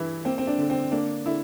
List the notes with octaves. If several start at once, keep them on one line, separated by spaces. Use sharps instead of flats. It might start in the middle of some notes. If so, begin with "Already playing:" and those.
Already playing: G2 E3 E4
A#3 C4
C4
D4
D3
C4
A#3 D4
D3 E4